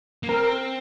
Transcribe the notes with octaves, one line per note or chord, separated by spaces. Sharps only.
A#3
C4 A#4